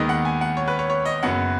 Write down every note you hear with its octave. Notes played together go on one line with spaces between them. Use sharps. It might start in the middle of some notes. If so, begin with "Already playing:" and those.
Already playing: D#2 D#3 G#3 B3 D#5
F#5
G#5
F#5
C#5
B4
C#5
C#5
D#5
F#1 F#2 F#3 B3 F#5